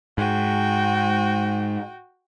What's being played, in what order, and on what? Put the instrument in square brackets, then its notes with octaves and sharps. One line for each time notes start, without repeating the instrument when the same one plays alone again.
[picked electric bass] G#2 [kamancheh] F#4 G5